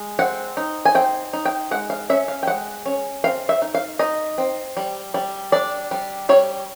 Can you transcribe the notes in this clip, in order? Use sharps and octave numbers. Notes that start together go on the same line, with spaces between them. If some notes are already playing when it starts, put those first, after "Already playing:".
Already playing: G#3
C4 F#5
D#4
G#5
C4 G5
D#4
G5
G#3 F#5
F5
C#4 E5
F5
G5
G#3 F#5
C#4
C4 F5
E5
D#4
F5
D#4 D#5
C4
G3
G3
D4 D5
G3
G3 C#5